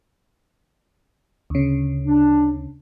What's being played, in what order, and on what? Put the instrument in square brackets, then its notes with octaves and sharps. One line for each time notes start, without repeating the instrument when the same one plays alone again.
[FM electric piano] D2 C#3
[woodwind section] D4